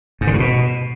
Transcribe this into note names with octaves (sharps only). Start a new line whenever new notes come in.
G#2
D3
G2
B2